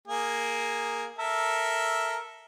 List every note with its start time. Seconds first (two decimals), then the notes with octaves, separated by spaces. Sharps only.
0.07 A#3 G#4
1.19 A4 A#4 E5